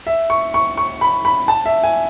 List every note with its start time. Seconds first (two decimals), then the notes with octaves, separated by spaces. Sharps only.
0.07 E5
0.30 C#6
0.54 C#6
0.77 C#6
1.01 B5
1.25 B5
1.48 A5
1.66 E5
1.83 G#5